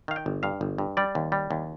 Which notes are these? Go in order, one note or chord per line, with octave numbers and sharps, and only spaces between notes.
D#3 F5
G5
G1
G2 F5
G1
G2
G3 D5
D#2
G3
D#2